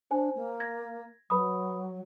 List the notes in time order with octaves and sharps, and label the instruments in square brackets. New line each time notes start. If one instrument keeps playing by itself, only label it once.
[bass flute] D4 [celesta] C5 G#5
[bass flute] A#3
[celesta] G#6 A#6
[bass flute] F#3 [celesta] B4 B5 D#6